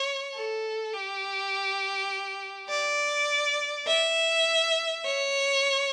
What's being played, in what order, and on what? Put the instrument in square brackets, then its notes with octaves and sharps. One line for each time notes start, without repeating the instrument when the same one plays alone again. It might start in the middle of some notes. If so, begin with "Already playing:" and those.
Already playing: [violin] C#5
A4
G4
D5
E5
C#5